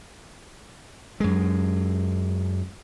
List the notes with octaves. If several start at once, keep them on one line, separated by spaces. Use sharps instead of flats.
F#2 G#3